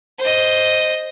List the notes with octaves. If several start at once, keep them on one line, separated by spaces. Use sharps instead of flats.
C5 D#5